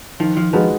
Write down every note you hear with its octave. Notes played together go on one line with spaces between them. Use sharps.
D#3 F3
F3
F3 G#3 D#4 F#4 B4